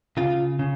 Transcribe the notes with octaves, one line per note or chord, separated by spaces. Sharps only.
C#3 F4
C#3